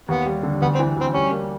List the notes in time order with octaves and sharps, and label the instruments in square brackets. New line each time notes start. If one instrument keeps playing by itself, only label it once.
[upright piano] D#2 [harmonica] B3
[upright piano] G3
D3
[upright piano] D2 [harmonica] B3
[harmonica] C4
[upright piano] E3
[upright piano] D2 [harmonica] C4
[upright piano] G3 [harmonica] C#4
[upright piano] A#3